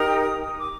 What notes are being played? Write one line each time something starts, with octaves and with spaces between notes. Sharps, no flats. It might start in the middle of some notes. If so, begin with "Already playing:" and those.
Already playing: D#4 G4 A#4 D#6
D6